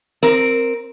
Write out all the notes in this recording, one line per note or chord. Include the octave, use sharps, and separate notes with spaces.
C4 A#4